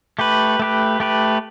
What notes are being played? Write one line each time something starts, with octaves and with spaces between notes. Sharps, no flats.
A3 G4 B4
A3 G4 B4
A3 G4 B4